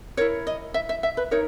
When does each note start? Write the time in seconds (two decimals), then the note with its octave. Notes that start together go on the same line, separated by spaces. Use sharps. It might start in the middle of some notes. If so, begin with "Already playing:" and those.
0.17 E4 A#4 C#5
0.47 D#5
0.74 E5
0.89 E5
1.03 E5
1.17 B4
1.31 D#4 A#4 C#5